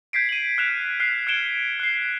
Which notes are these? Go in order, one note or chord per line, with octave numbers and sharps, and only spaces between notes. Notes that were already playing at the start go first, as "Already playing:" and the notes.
G6 G#6 B6 C7 D7
D#7 F#7
F6 F#6 D7 E7 F7
F6 F#6 C7
F6 G#6 C#7 D7 E7 G7
F#6 C7